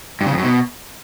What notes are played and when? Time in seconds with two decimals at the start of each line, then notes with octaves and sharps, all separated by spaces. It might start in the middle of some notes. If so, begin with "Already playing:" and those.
0.21 G2
0.26 C#3
0.32 F2
0.38 F#2
0.43 B2